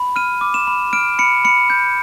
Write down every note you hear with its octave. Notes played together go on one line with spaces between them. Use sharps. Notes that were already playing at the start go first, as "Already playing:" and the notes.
Already playing: B5
F6 D#7
D6
E7
B5
F6 D7
B5 C#7
B5 C#7
G6